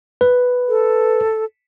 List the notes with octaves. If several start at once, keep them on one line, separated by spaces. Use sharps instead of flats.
B4
A4